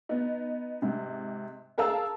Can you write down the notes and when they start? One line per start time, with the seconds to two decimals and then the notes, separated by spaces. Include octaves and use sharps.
0.09 B3 D#4
0.82 G#2 C3
1.78 G#4 A#4 F5 A5 E6